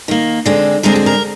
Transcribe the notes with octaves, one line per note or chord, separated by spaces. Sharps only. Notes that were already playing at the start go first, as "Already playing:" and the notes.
D#3 A#3
D3 G#3 C4
D3 G#3 C4 A#4
G#4
A#4